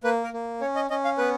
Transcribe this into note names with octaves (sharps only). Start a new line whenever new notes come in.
A#3 B4
A#4
A#3
C#4 C#5
D#5
C#4 D#5
F5
B3 B4